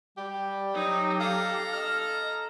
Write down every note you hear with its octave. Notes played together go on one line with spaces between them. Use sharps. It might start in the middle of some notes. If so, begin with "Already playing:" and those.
G3 G4
F#3 D#4
A4 F5 A#5
D#5 F6